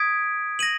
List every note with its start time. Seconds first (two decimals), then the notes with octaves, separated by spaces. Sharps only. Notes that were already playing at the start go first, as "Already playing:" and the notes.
Already playing: D#6 G#6 B6 D7
0.59 A#6 D#7 F#7